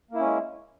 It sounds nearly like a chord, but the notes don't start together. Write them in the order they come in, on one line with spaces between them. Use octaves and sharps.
A#3 E4 C#4 G#3